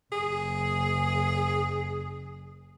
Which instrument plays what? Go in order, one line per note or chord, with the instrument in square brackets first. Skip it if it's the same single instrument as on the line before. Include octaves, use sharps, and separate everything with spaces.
[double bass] F#1 [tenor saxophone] G#4